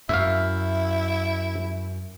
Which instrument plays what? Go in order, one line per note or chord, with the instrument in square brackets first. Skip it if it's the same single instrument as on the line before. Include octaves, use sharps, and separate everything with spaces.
[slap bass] F#2 [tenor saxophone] E4 [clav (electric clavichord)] E5 F5